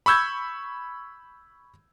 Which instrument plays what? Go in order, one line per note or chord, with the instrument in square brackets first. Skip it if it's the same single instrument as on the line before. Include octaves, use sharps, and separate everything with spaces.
[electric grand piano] B5 C#6 E6 G6 G#6